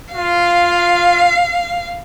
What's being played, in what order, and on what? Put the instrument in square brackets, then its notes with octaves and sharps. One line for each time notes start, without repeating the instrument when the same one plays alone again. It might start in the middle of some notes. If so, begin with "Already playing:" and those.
[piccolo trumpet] F4 [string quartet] F5